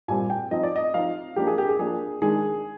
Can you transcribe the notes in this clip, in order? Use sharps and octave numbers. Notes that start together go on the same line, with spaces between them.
A#2 G3 C4 G#5
G5
F3 C4 D#4 D#5
D5
D#5
F3 C4 D#4 F5
F3 A#3 D4 G4
G#4
G4
G#4
F3 A#3 D4 G#4
D#3 G#3 D4 G#4